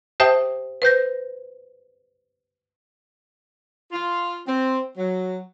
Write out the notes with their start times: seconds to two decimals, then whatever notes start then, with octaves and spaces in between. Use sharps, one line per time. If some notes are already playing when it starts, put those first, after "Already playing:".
0.20 G4 C5 E5 G5 A5 D#6
0.82 B4 C5 G6 A#6
3.92 F4
4.46 C4
4.97 F#3